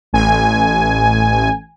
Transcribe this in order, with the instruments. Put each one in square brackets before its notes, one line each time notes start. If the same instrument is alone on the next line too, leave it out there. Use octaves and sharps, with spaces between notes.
[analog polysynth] A1 G#5